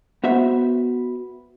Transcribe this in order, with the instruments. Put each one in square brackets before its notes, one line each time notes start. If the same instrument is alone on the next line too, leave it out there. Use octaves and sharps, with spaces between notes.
[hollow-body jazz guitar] B3 F#4 C5 E5